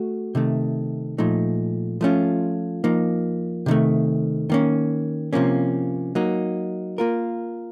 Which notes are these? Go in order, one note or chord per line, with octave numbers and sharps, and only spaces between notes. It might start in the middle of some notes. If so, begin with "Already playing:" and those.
Already playing: A3 F#4
C3 D#3 A3
A#2 F3 A3 D#4
F3 A3 C#4 F4
F3 A#3 D#4
C3 D#3 A3
D#3 A#3 C#4
C3 F3 A#3 C#4
F#3 A#3 D#4
A#3 F4 A#4